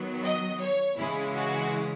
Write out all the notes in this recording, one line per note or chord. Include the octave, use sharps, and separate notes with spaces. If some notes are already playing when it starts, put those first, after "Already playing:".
Already playing: D#3 F#3 B3
D#5
C#5
C#3 E3 G#3 E4
F#4